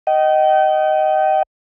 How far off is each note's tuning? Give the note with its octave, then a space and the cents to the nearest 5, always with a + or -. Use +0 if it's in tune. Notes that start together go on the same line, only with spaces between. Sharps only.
D#5 +0 G5 -35